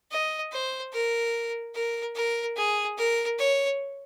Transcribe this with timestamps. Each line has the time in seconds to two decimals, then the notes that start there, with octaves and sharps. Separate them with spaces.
0.11 D#5
0.52 C5
0.93 A#4
1.75 A#4
2.15 A#4
2.57 G#4
2.98 A#4
3.38 C#5